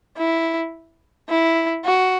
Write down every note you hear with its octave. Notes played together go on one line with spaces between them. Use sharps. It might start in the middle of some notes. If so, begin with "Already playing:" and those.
E4
E4
F#4